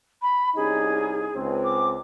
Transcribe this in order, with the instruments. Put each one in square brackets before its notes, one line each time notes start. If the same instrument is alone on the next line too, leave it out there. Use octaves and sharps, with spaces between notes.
[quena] B5
[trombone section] C2 C#4 D#4 [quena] G#4
[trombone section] C#2 C4
[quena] D6